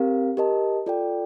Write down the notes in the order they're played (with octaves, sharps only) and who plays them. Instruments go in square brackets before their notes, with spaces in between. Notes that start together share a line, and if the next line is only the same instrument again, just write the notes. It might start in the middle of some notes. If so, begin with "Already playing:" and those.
Already playing: [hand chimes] C4 G4 A#4 F5
G4 A#4 D#5 A5
F4 A4 D5 G5